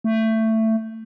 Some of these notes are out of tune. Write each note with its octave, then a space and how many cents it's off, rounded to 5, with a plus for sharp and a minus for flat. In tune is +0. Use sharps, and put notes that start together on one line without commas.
A3 +15